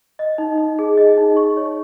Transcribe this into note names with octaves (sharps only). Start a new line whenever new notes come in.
D#5
D#4
D#4
G#4
D#5
D#4
C#6
C#5